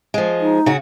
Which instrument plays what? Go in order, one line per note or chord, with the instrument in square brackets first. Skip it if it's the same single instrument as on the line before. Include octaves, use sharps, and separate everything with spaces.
[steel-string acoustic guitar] F3 G#3
[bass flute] D#4
[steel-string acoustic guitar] C#3 F#4